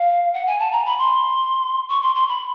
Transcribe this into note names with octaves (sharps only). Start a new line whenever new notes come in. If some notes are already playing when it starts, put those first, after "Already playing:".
Already playing: F5
F#5
G#5
A5
A#5
B5
C6
C#6
C6
C6
B5